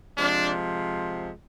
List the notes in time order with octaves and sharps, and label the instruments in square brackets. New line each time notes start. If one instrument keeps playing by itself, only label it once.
[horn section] C3 F3 G#3 D4